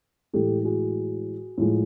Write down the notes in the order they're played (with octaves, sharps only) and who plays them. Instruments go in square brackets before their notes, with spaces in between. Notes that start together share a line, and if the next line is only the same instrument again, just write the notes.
[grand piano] A2 E3 G#3 G4 A4
F#4 G#4
A2 F3 G#3